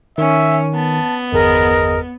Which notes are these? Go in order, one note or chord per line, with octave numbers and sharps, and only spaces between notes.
D#3 C#4 E5
B3 A5
G1 E2 G#4 A#4 D#5